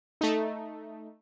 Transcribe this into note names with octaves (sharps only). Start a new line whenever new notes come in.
A3 D#4